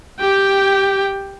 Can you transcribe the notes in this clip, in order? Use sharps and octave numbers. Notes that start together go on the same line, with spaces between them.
G4 G5